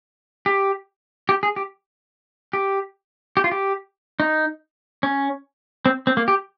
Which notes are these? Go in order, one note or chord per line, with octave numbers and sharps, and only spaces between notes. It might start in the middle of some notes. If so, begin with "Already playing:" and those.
G4
G4
G#4
G4
G4
G4
F4
G4
D#4
C#4
C4
C4
A#3
G4